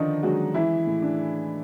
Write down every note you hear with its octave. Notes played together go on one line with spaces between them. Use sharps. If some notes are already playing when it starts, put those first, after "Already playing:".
Already playing: D3 D#3 F3 D4 D#4
F#3 G#3 F#4
E3 E4
A2
D4